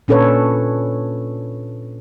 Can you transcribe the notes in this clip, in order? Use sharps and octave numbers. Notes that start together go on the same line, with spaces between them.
A#2 C#4 D4 A4 B4 C#5